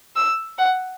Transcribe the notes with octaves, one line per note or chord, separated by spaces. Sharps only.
E6
F#5